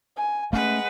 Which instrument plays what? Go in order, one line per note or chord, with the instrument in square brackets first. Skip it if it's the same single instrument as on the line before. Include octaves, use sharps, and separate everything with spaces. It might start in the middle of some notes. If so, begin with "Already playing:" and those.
[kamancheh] G#5
[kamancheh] G#3 F#5 [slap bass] A3 C#4 [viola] B4